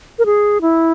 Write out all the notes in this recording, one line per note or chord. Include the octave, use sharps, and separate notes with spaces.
A#4
G#4
E4